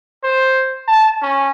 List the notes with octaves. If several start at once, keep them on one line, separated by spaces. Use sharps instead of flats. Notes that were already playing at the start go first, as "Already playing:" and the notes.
C5
A5
C#4